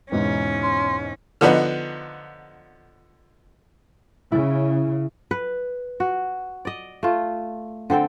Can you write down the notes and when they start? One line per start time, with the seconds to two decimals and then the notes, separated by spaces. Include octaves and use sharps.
0.12 E2 G#2 B2 C#4 D#4
0.63 C6
1.41 D3 F3 B3 D#4
4.32 C#3 E4
5.31 B4
6.00 F#4
6.65 D5 D#5
7.03 A3 F4
7.90 D3 C4 A4 G5